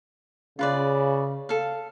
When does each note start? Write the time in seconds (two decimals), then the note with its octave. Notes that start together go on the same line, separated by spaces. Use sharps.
0.59 C#3 F4 B4 D5
1.49 A4 F5